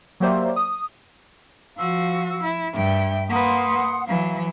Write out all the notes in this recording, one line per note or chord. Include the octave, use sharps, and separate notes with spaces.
F#3 A#3 G4 C5 D5 E5
D#6
F3 F#4 F5 E6
E4
G2 E5 G5
A#3 B4 F#5 C6 D#6
E3 F#3 F5